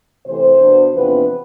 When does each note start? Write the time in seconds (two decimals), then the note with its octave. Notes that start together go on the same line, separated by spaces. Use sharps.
0.26 C3 E3 A3 C5
0.60 B2 B3 D4
0.94 E2 C3 F3 B3 D4 B4